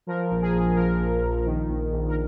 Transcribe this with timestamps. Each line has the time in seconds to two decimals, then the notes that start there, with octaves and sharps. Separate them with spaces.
0.07 F3 A#4
0.30 A#1
0.42 G#4
0.53 A#1
0.76 F3 A#4
0.99 A#1
1.22 A#1
1.45 D#3
1.68 A#1
1.92 A#1
2.08 A#4